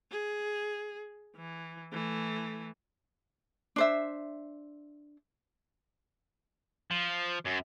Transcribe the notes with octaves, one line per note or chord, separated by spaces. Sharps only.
G#4
E3
E3 A3
D4 C5 E5
F3
F#2